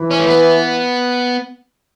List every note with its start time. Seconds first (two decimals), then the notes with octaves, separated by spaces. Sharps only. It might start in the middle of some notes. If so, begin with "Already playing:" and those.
Already playing: E3
0.11 C#4
0.19 A3
0.28 B3